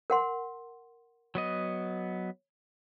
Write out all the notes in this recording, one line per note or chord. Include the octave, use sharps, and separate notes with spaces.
A#4 F#5 C6
F#3 B3 D#5